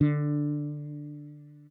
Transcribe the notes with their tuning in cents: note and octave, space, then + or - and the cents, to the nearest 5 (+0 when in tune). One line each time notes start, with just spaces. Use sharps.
D3 +10 D4 +0